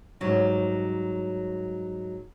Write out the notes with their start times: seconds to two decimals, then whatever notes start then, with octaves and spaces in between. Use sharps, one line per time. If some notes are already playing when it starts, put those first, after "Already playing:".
0.20 G#2 F#3 G3